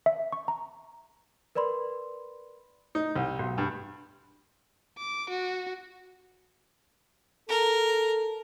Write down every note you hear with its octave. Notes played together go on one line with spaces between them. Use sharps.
E5
C#6
A#5
A#4 B4 D5 B5 C6
D#4
C2
B1
G2
D6
F#4
A4 A#4